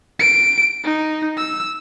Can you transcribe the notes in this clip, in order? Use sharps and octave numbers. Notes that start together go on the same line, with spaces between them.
D7
D#4
E6